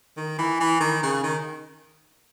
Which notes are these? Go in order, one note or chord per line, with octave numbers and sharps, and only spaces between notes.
D#3
E3
E3
D#3
C#3
D#3